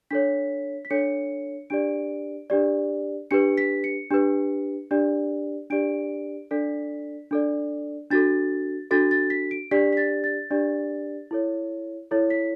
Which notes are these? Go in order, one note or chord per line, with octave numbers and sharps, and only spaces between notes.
D4 A4 C#5 B6
B6
D4 A4 C#5 C#7
D4 G4 D5 D7
D4 G4 D5
D4 G4 B4 C#7
B6
C#7
D4 G4 B4
D4 G4 D5
D4 G4 D5 D7
D4 A4 D5 B6
D4 A4 D5
D4 F#4 A4 A6
D4 F#4 A4 A6
A6
B6
D7
D4 G4 D5 B6
B6
A6
A6
D4 G4 D5
E4 A4 C#5
E4 A4 C#5
B6